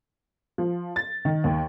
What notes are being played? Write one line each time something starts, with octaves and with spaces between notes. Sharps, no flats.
F3
A6
D#3
D#2